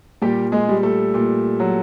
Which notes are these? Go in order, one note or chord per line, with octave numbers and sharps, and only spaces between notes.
A#2 G3 G4
G#3 G#4
G3
A3 A4
A#2
F#3